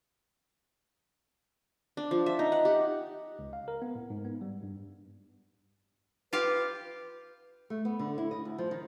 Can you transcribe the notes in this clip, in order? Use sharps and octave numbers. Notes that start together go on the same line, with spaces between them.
D4
F3
E5
D#4
F#5
G4
C#2
F5
A#4
B3
A2
G#2
B3
G3
G2
F4 G4 B4 F5
A3
B3
D3
E4
D#5
D2
F3
D#3